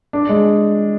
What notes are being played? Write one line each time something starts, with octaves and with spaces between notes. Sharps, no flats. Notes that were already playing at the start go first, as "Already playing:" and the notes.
D4
G#3